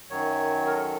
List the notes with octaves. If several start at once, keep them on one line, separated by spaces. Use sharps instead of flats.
F#2 D#3 F#3 C#5
A#4
A4